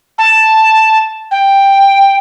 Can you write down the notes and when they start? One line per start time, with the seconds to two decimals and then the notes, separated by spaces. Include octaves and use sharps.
0.18 A5
1.31 G5